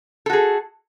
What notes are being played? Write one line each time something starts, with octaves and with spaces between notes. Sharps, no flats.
F#4 G#4 A4